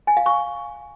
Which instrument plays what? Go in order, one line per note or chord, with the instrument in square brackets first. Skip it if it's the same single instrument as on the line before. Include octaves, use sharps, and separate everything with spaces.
[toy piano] G#5
F5
C#6